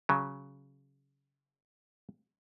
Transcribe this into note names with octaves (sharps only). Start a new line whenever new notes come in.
C#3 F#3